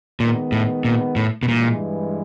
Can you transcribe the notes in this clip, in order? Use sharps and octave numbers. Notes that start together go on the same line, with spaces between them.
A#2 D#3 G#3 B3
A2
A#2
A2
B2
G2 A#2 E3 G#3